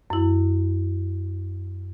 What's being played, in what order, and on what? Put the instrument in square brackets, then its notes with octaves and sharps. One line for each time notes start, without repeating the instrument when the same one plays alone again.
[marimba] F#2 E4